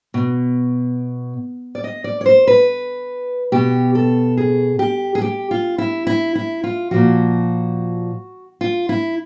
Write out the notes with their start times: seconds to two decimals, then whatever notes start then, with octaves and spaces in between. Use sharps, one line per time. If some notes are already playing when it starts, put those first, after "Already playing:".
0.14 B2
1.75 D5
1.84 D#5
2.04 D5
2.21 C#5
2.26 C5
2.47 B4
3.52 B2 G4
3.95 A4
4.37 G#4
4.79 G4
5.15 G#4
5.22 G4
5.51 F4
5.78 E4
6.07 E4
6.35 E4
6.64 F4
6.91 A#2 F3 F#4
8.61 F4
8.89 E4